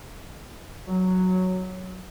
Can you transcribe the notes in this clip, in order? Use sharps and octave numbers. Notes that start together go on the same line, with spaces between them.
F#3